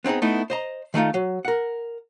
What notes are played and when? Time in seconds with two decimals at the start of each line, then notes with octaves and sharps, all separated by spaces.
0.05 B3 C4 D4 D#4 G#4
0.22 A3 B3 D#4 E4
0.50 C5 D#5 A#5
0.94 D#3 A3 D#4 F4
1.14 F#3
1.45 A#4 F#5